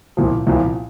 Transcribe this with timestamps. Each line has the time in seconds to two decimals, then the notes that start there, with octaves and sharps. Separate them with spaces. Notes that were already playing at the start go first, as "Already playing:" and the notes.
0.17 C2 A#2 F3
0.47 C2 A#2 F3